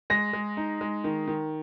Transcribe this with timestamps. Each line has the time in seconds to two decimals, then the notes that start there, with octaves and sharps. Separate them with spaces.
0.10 G#3 A#6
0.33 G#3
0.57 D#4
0.81 G#3
1.04 D#3
1.27 D#3